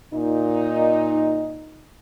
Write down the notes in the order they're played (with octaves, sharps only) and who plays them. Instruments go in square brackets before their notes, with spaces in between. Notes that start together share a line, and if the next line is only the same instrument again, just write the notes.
[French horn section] A#2 D#4